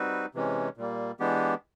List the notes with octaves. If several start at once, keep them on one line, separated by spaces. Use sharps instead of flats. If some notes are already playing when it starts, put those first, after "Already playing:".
Already playing: G3 C4 D#4 F#4 B4
C3 E3 G#3 C#4
A#2 G3 A#3
E3 G#3 B3 D4 G4